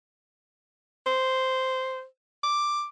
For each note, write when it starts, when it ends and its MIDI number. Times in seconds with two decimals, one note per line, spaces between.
1.06 2.05 72
2.43 2.87 86